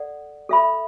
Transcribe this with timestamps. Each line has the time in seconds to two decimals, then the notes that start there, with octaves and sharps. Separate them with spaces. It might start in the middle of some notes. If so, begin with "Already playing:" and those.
Already playing: A4 D5 F#5
0.49 A4 E5 B5